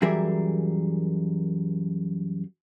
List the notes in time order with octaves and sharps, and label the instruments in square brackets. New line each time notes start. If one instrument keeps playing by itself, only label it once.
[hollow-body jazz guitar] F#2 E3 G3 G#4 A#4 E5